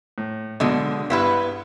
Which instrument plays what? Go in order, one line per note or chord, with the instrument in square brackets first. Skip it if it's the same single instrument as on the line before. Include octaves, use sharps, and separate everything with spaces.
[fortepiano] A2
[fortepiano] B1 B2 [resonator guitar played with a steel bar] D3 G#3
[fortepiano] G2 C6 [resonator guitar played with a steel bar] B3 E4 B4